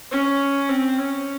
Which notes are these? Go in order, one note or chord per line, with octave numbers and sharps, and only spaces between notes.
C#4
C4
C#4